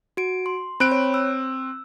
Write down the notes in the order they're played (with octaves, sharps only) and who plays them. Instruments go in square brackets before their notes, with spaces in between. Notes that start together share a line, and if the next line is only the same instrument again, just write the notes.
[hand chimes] F#4 D7
C6
[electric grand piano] C4 F#6 D7 [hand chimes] B5
[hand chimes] C#5
E6